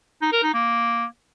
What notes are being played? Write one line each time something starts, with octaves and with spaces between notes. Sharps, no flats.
D#4
A#4
D#4
A#3